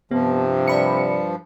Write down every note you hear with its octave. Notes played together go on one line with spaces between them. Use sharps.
G2 C3 F3 B3
D5 B5 C#7